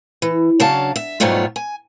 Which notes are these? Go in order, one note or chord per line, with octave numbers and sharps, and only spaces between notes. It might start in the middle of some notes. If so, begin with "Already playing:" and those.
E3
C#3 F#3 D4 F5 A5
E5
G#2 B2 F#3 G3 A3 F4
G#5